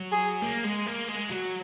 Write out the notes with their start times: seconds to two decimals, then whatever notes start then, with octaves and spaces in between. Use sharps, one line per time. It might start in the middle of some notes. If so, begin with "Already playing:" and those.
Already playing: F#3
0.12 G#4
0.42 A#3
0.64 G#3
0.86 A#3
1.08 G#3
1.30 F#3